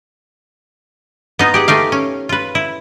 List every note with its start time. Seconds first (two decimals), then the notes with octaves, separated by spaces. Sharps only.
1.39 B3 D#4 F4
1.54 G4 G#4 F#5
1.68 A3 D#4 G4 F5
1.92 C#4
2.29 F4 B4
2.55 E4